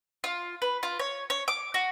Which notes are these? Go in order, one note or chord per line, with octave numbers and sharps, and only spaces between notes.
F4
B4
F4
C#5
C#5
D6
F#4